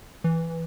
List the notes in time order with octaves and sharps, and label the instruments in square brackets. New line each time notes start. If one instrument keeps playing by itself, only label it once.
[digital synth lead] E3